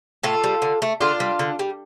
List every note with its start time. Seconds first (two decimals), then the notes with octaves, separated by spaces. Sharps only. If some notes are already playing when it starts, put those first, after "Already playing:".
0.23 A2 F4 A4
0.44 G3
0.62 D3
0.82 A3
1.01 D3 D4 F4
1.20 G3
1.39 D3
1.59 G3